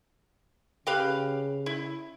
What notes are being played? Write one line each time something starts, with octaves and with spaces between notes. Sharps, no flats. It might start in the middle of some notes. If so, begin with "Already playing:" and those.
C#3 G4 B4 F5
E4